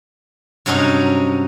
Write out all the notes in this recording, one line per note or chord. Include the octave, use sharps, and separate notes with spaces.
G2 C3 F#3 C#4 D#4